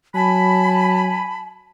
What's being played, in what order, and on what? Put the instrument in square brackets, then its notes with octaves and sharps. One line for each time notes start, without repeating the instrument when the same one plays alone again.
[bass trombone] F#3 [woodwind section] G#5 B5 [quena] A5